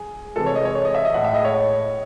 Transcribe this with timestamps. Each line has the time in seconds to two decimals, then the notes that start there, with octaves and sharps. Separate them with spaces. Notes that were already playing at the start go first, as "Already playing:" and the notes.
Already playing: G#4
0.36 C3 E3 G#3 A4
0.46 C#5
0.55 D#5
0.65 C#5
0.75 C#5
0.85 D#5
0.95 E5
1.05 D#5
1.14 A2 G#3 F#5
1.24 E5
1.34 D#5
1.45 C#5